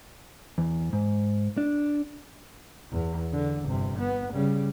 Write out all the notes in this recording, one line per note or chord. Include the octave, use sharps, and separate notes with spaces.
E2
G#2
D4
E2
D3
G1 C3
B3
C#3 G3